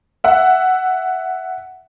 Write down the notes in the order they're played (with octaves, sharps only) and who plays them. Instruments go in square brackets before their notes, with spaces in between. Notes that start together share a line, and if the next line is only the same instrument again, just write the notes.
[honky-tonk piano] E5 F#5